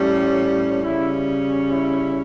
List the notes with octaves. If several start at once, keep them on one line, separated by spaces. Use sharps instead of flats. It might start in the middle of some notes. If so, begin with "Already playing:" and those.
Already playing: A2 G3 C#4
C#3 G3 C#4 E4
E4